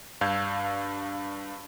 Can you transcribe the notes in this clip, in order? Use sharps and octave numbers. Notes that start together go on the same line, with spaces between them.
G2 D4 F5 E6 G6 G#6